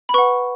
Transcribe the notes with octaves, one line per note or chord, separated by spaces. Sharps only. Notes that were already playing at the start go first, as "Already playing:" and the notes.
B5
B4 F#5 C#6